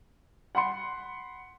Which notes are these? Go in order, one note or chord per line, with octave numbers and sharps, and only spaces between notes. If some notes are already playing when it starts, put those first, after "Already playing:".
F#5 B5 C6 C#7